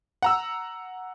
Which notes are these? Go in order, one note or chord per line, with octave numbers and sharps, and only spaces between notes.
F#5 A#5 E6